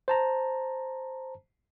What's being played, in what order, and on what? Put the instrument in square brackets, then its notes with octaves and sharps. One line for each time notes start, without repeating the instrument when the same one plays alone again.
[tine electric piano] C5 A5 A#5